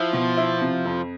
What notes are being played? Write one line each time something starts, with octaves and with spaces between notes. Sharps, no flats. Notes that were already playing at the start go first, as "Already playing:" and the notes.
Already playing: F3 E4
B2
E4
C3
F2